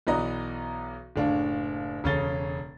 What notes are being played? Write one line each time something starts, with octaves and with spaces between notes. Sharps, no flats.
B1 E3 B3 D5 D#5 A#5
F#1 A2 D4 F5
E1 C#3 C#4 A4 A6 G7